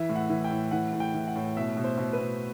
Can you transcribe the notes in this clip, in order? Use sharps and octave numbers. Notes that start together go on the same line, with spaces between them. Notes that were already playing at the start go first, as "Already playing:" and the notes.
Already playing: E3 E5
A2
F#5
E3
G5
A2
E3 F#5
A2
G5
E3
F#5
A2
B2 E5
B2
C5
B2
B4
B2